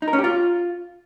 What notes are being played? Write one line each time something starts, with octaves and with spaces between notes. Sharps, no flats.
D#4
A#4
C#4
G4
F4